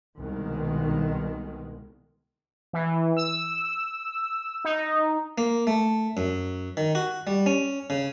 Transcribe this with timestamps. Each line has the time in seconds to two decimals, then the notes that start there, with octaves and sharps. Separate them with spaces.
0.18 C2 B2 D#3 G#3
2.73 E3
3.17 E6
4.64 D#4
5.38 A#3
5.67 A3
6.17 F#2
6.77 D#3
6.95 F#4
7.27 G3
7.46 C#4
7.90 C#3